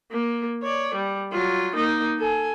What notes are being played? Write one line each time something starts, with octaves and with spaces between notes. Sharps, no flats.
A#3
C#5 D5
G3
F#3 F4
A#3 D#4
A4 G#5